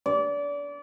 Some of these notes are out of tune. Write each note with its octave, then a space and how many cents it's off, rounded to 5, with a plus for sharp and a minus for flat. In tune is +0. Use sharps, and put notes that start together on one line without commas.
D5 -30